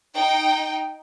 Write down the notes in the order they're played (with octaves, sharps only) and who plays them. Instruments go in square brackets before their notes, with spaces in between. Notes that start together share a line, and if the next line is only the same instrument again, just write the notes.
[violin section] D#4 G5